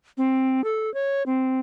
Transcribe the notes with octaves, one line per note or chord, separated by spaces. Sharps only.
C4
A4
C#5
C4